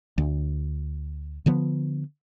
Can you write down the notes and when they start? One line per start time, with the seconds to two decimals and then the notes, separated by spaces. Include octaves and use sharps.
0.18 D2
1.46 D3 F3 B3